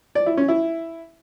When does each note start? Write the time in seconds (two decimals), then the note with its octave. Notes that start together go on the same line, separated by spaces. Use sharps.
0.15 D5
0.26 E4
0.37 C#4
0.48 E4